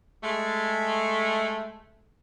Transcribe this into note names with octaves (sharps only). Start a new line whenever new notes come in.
G#3 A3